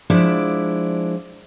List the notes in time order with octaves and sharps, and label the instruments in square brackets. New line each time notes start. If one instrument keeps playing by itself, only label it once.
[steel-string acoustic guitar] F3 G#3 D4 E4 D5